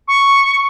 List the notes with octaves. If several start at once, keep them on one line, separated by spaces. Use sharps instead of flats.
C#6